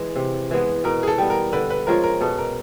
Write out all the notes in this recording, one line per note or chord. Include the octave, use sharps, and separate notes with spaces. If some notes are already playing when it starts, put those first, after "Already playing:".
Already playing: E3 G#3
C3
E3 G#3 B3
B2 A#4
G#4
A4
G3 B3
A#4
D3 B4
B4
F3 G#3 C#4 A#4
A#4
B2 A4
A#4